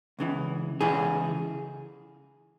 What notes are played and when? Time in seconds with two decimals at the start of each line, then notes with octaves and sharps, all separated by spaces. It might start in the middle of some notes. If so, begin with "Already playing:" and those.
0.19 C#2 C#3 E3
0.81 C#2 C#3 E3 G#4